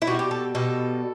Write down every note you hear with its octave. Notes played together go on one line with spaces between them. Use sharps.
E4
B2 G3 F#4
G4
A4
B2 G3 A4